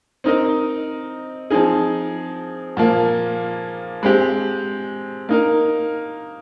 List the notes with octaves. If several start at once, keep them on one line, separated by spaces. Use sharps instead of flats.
C4 D#4 A#4 D#5
F3 C4 D#4 G#4
A#2 F3 A#3
G#3 C4 G4
A#3 D#4 A#4